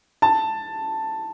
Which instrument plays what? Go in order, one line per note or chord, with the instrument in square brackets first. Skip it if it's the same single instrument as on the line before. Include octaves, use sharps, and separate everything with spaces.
[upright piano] A5